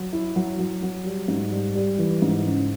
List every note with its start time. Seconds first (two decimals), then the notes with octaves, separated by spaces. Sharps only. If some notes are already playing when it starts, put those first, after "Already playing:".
Already playing: F#3
0.13 E4
0.36 F#3
0.59 F#3
0.83 F#3
1.06 G3
1.28 G#2
1.52 G3
1.75 G3
1.99 E3
2.22 G#2
2.44 C#3